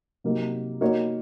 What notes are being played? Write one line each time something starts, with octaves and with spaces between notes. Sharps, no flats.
C3 F#3 A#3 D#4
A#3 D#4 F#4 C#5